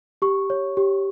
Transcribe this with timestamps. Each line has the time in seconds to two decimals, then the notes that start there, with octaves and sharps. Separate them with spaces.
0.22 G4 C#6
0.50 C#5
0.77 G4